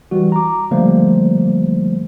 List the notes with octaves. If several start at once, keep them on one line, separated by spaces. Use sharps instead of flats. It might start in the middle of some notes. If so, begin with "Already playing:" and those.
E3 G3 F#4
A#5 D6
D3 F3 G3 A3 A#3 C5